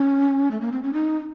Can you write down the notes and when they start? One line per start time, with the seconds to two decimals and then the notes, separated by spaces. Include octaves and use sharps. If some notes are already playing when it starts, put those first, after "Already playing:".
Already playing: C#4
0.51 A3
0.61 A#3
0.72 C4
0.83 C#4
0.93 D#4